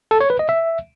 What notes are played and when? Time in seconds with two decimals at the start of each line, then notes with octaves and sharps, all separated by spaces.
0.11 A4
0.20 C#5
0.30 B4
0.39 D#5
0.49 E5